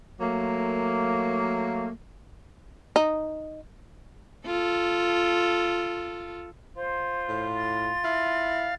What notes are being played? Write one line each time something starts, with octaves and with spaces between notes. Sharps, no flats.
F#3 A3 A#3
D#4
F4 A4
F4 C5
A2
A6
E4 F5